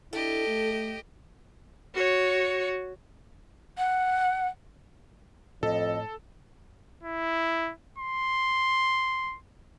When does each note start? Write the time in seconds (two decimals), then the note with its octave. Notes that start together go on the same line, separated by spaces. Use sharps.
0.13 D4 E4 G4 A4 D#5
0.47 A3
1.95 F#4 C#5
3.77 F#5
5.63 F2 A2 A4 D#5
7.03 E4
7.98 C6